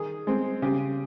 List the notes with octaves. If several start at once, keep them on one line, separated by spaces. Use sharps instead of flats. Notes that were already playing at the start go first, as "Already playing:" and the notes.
Already playing: D#3 G#4
G#3 C4
C#3 G4